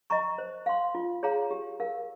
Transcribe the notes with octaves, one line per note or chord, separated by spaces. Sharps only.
D#5 A#5 C#6
C5
F5 C6
F4
G#4 C#5 F5 A#5
G4
A#4 F5